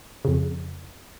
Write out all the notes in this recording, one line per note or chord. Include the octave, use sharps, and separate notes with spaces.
F2 C#3